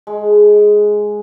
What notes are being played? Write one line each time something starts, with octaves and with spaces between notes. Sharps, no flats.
G#3